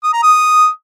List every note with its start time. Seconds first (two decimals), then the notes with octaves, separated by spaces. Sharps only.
0.03 D#6
0.13 A#5
0.23 D#6